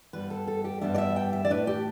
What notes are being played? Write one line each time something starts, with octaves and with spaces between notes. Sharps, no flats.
G2 G3 B3 B4
A4
A4
G4
G2 G3 B3 D4 E5
D5
E5
G5
E5
D5
A2 A3 D4 B4
G4